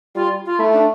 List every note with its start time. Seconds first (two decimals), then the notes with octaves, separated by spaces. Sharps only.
0.15 G3 F4
0.46 F4
0.59 A3 E4
0.73 D4